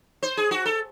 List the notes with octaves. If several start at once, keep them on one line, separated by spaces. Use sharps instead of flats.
C5
G#4
F#4
A4